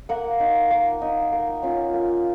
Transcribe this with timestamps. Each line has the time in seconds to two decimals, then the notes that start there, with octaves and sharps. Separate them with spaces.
0.09 A#3 F#5
0.40 D#4
0.70 A#3
1.01 D#4
1.32 A#3
1.63 C#4 F4
1.93 A#3